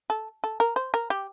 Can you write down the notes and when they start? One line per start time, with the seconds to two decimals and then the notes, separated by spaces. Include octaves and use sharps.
0.10 A4
0.44 A4
0.60 A#4
0.76 C5
0.94 A#4
1.10 G4